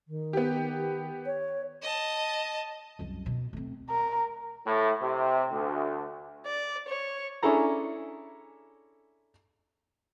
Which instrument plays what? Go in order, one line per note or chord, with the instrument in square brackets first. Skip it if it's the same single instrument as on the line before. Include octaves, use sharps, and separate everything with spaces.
[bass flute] D#3
[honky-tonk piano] B3 G4
[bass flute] C#5
[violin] D#5 A5
[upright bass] C2 F#2
B2
A3 C4
[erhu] A#4
[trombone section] A2
C3
D2
[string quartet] D5
C#5
[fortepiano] C#4 D4 E4 G#4 A4 A#5